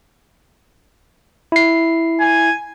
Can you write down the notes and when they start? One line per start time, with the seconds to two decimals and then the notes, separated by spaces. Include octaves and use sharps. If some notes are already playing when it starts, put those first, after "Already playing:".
1.52 E4 C7
2.20 G#5